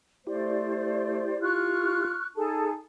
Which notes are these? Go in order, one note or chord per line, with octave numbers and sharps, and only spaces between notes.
A3 E4 G4 C5 D5
F4 C#6 F6 F#6
D#4 G#4 A4 A5